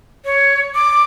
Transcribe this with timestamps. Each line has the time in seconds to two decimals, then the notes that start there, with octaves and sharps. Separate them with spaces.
0.25 C#5
0.75 D6